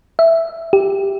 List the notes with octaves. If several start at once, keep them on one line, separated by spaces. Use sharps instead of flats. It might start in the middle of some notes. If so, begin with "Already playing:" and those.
E5
G4